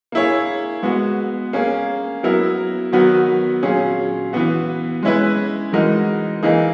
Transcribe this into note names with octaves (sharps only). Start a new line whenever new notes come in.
A#3 E4 G#4 C#5
G#3 B3 F#4
A#3 C#4 G#4
F#3 B3 E4 A#4
D#3 F#3 B3 F#4 B4
A#2 F#3 C#4 G#4
E3 B3 F#4
G#3 C#4 E4 B4
E3 G#3 D#4 F#4 A#4
E3 A#3 D#4 G#4